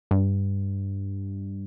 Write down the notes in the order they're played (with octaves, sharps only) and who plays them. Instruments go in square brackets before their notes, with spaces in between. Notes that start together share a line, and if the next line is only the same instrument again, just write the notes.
[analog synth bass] G2